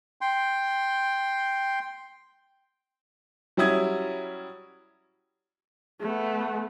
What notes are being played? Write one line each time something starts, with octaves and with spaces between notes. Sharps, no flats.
G5 C6
F#3 G3 C#4 E4 D#6 G#6
A3 B3